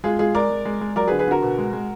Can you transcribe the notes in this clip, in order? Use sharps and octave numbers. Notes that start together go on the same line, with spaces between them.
G#3 F4 G#4
G#3 F4 G#4
G#3 A#4 D5
G#3
G#3
G#3
F#3 A#4 D5
G#4 B4
D3
G#4 B4
D3 F#4 A#4
B2
G#3
G#3